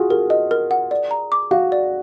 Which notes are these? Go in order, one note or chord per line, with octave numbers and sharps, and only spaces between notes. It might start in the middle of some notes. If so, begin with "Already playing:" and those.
Already playing: F4 F#4 G#4
G#4 A#4
D#5
A#4
F#5
D5
A#5
D6
F#4 F5
D5